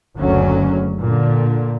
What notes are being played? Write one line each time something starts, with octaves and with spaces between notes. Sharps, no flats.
F#1 D2 F#3 C#4
A#2 D3